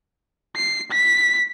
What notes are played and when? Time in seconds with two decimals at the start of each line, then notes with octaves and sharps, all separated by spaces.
0.56 C7
0.92 B6